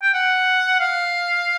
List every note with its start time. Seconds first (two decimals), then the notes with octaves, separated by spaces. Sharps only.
0.02 G5
0.14 F#5
0.80 F5